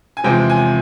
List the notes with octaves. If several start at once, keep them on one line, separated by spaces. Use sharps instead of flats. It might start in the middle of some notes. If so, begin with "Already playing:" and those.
G#5
E2 C3 F3 G#3 G5
G#5